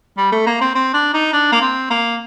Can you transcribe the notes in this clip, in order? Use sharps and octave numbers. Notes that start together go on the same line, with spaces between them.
G3
A3
A#3
C4
C4
D4
D#4
D4
A#3
C4
A#3